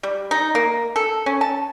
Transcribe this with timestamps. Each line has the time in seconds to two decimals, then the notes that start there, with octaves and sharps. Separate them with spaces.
0.03 G3
0.31 D#4
0.55 A#3
0.96 A4
1.26 C#4
1.41 A5